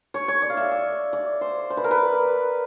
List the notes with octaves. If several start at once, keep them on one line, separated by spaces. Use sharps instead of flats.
C#5
C#5
D5
F5
E5
E5
D5
C5
C5
B4
A#4
B4